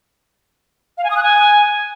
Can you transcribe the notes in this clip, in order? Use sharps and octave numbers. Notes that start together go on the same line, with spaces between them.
F5
G#5
D#6
F#6
G#5